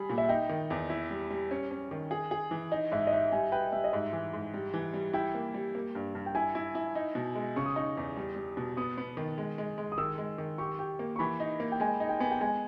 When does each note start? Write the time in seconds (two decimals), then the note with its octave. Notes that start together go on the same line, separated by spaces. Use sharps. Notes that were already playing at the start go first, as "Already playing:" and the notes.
Already playing: G3 G#4 B5
0.10 A#2
0.18 E5
0.29 D#4 G5
0.49 D#3
0.70 E2
0.90 E4
1.10 G3
1.30 G3
1.51 C#4
1.71 C#4
1.91 D#3
2.11 G#4
2.31 G#4
2.51 E3
2.72 D#4 D#5
2.92 G#2 E5
3.07 D#5
3.12 D#4 E5
3.32 G3 G#5
3.52 B4 G5
3.73 G3 E5
3.84 D#5
3.92 G#2 E5
4.13 E3
4.33 G#2
4.54 G3
4.74 E3
4.93 G3
5.13 E4 G5
5.35 A#3
5.54 G3
5.75 A#3
5.95 G2
6.15 G2
6.26 G5
6.35 E4 G#5
6.55 E4
6.75 E4
6.95 D#4
7.15 B2
7.35 G#3
7.56 C#3 C#6
7.66 D#6
7.76 D#4 C#6
7.97 E2
8.17 G3
8.36 G3
8.57 B2
8.77 B3 D#6
8.98 B3
9.17 D#3
9.38 G#3
9.58 G#3
9.78 G#3
9.92 D#6
9.98 D#3 E6
10.18 G#3
10.38 D#3
10.58 G4 C#6
10.79 G4
10.99 A#3
11.16 C#6
11.19 E3 B5
11.40 D#4
11.60 A#3
11.72 G5
11.80 G#3 G#5
12.00 D#4
12.09 G5
12.20 B3 G#5
12.31 G5
12.41 G#3 G#5